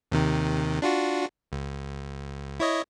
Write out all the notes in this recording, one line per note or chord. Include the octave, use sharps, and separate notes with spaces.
D#2 C3 D#3
D4 F4 F#4
C#2
E4 C#5 D#5